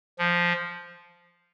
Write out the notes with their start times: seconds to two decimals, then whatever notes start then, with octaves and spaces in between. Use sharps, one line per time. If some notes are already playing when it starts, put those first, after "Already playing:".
0.19 F3